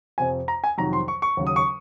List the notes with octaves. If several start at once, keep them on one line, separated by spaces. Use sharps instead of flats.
F2 C3 F3 G#5
A#5
G#5
F2 C3 D#3 F#3 A#5
C6
C#6
C#6
D#2 C#3 F#3
D#6
C#6